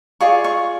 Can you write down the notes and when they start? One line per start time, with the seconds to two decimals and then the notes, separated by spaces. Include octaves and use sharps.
0.21 F4 G#4 D5 C#6
0.44 C#6